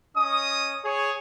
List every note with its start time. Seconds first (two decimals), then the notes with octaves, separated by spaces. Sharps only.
0.16 C#4 D#5 D#6
0.84 G#4 C#5